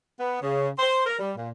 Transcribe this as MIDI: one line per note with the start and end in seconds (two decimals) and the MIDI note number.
0.20 0.40 59
0.42 0.69 49
0.79 1.04 72
1.07 1.18 70
1.19 1.34 55
1.37 1.50 46